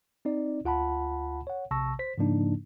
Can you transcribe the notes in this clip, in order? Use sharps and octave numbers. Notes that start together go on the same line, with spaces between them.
C4 D#4 D5
D2 F4 F#5 A5 B5
C#5 F#5
A#1 C3 A5 C#6 E6 A#6
C5 B6
G#2 C#3 F3 A#3 D4 D#4